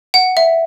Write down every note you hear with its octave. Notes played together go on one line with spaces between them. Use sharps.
F#5
E5